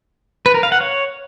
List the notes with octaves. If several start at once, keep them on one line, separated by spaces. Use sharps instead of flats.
B4
A#4
F5
F#5
C#5